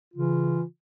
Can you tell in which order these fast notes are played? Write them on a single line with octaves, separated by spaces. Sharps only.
F4 C#3 E3